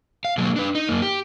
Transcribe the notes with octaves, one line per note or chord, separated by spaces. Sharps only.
F5
B2 F#3 G#3 A#3
D4 B4
D#4
F#2 A#3
G4